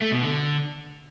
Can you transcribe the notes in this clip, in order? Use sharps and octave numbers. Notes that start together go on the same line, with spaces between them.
A3
B2
D3